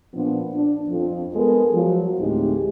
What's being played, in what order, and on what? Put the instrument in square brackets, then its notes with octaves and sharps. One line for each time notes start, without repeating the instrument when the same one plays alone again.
[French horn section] A#2 F3 B3 D4
D4
F2
G#3 B3 A4 A#4
F3 F#3
D2 A2 G#3 C4 D#4 G4